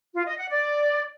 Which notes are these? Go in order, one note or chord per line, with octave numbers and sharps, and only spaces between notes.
F4
D#5
F#5
D5